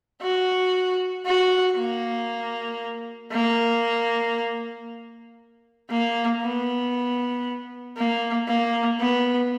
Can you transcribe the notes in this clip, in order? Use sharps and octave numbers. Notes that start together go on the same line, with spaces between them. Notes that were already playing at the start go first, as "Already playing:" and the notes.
F#4
F#4
A#3
A#3
A#3
B3
A#3
A#3
B3